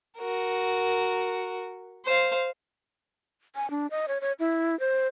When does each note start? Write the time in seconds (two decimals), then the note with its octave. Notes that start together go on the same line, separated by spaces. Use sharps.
0.18 F#4 A#4
2.05 C5 F5
3.56 G#5
3.71 D4
3.91 D#5
4.08 C#5
4.21 C#5
4.40 E4
4.80 C5